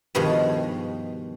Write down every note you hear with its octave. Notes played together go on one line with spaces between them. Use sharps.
G2 B2 D#3 F3 G#3